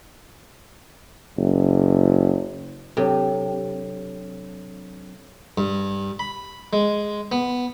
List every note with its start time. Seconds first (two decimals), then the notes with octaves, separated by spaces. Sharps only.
1.37 F#1
2.97 C3 F#3 C4 D4 A4 C#5
5.58 G2
6.19 B5
6.73 G#3
7.32 B3